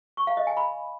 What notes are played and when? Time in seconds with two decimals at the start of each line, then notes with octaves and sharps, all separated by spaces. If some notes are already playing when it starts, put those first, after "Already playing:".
0.17 C#6
0.27 F5
0.37 D#5
0.47 G#5
0.57 B5